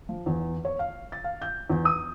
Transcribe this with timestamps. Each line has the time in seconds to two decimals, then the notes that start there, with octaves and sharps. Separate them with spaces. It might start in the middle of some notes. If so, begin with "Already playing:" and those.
0.09 F3
0.26 E2
0.65 C#5
0.79 F5
1.12 A6
1.24 F5
1.42 G6
1.70 E2
1.85 D#6